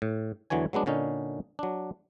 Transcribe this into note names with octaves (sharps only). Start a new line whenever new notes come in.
A2
E2 D3 E3 F#3 C#5 G#5
F#3 G#3 B3 D4
A#2 D3 C#4 D#4
F#3 D4